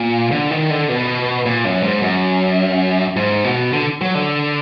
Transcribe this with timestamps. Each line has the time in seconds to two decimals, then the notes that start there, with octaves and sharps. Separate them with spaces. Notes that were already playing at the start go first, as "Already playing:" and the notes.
Already playing: A#2
0.32 D3
0.51 D#3
0.70 D3
0.89 B2
1.46 A#2
1.65 F#2
1.83 G#2
2.02 F#2
3.16 G#2
3.44 B2
3.73 D3
4.01 F#3
4.15 D3